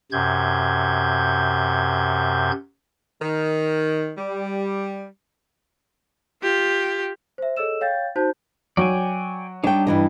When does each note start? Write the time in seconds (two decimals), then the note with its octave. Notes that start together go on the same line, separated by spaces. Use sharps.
0.12 F#2 C3 G6 G#6
3.21 D#3
4.18 G3
6.43 F4 G4
7.38 C5 E5
7.57 G#4 A4 C#5 D#5 E6 E7
7.81 C#5 F5 G5 G6 A6
8.16 D#4 F#4 C5 A5 G6
8.77 F#3 D5 G5 G#5
9.64 G3 D4 D#4 C#5 G5
9.87 G2 E3 D#5